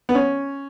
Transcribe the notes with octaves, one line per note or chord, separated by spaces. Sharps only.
B3
C#4